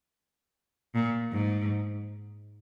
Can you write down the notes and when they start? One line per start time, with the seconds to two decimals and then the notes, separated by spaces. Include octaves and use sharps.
0.95 A#2
1.32 G#2